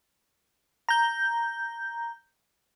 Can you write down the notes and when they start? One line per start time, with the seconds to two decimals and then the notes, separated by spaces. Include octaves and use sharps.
0.89 A#5 G6